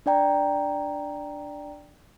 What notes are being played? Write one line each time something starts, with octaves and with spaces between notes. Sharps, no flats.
D4 D5 G5 A#5